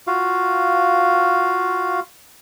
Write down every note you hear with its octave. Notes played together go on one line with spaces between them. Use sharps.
F4 F#4 F5